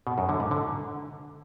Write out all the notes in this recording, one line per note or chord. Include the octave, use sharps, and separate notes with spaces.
B2
F#2
D3
G#2
D3